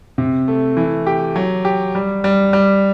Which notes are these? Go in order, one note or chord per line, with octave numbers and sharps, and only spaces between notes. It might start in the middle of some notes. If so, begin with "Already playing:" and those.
C3
A3
E3
G4
F#3
G4
G3
G3
G3